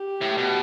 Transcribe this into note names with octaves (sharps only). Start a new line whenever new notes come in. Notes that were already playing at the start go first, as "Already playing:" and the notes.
Already playing: G4
A2
B2